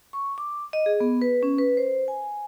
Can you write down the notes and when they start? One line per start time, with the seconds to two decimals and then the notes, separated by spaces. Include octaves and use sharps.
0.13 C#6
0.38 D6
0.73 D#5
0.86 G#4
1.00 B3
1.22 B4
1.43 C#4
1.58 B4
1.77 C5
2.08 G#5